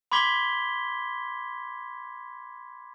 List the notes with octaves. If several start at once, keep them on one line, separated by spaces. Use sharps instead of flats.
B5 C6 D6 G#6 B6 G7